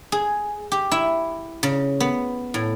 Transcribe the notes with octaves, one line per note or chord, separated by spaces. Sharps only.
G#4
G4
E4
C#3
B3
A2